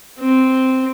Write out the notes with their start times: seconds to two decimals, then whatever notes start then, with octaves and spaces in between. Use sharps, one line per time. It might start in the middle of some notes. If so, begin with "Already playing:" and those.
0.19 C4